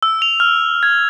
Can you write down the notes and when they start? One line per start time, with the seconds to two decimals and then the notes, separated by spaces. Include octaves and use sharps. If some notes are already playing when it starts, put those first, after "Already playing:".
0.03 E6
0.22 F7
0.40 F6
0.83 G#6